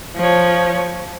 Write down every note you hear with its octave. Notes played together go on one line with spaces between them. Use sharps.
F3 C#5